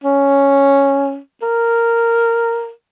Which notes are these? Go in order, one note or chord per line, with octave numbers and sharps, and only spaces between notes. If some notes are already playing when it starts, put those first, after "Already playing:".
C#4
A#4